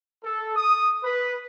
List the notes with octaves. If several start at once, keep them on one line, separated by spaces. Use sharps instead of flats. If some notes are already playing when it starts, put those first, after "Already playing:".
A4
D#6
B4